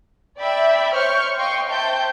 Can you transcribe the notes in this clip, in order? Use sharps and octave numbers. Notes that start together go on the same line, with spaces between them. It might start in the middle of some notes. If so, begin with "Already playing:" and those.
D5 E5 G5 B5
C5 C#5 C#6 F6 G6
D#5 F5 G5 C6 C#6
C5 E5 G5 A5 G6